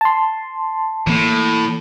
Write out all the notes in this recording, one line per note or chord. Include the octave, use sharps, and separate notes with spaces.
A5 C6
A2 E3 A#3